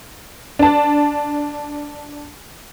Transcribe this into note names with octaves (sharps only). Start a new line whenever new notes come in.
D4 A5